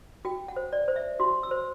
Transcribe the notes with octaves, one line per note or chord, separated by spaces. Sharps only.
F#4 G5
F#5
C5
D5
C5
E5
F#4 C6
E6
C5